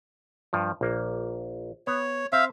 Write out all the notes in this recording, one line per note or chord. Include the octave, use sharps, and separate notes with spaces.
G2 F3
A#1 A#3
B3 C#5
C4 E5 F5